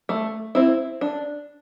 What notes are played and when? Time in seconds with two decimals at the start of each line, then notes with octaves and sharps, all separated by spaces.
0.09 A3
0.55 C4 E4
1.01 D4